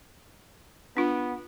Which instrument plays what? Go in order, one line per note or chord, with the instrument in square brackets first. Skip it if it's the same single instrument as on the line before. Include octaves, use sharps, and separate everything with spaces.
[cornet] B3 [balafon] D4 F4